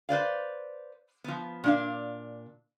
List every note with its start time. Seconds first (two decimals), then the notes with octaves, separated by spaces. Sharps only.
0.09 B4 C5 D5 F5
1.24 F3 B3
1.64 A#2 D4 F5